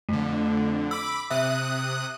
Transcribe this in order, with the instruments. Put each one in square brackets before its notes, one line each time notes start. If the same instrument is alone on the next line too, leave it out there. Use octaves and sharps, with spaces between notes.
[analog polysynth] F2 D3 [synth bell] A3
[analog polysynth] B5 D6 [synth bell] E6
[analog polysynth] C3 D#6 F#6 [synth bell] E5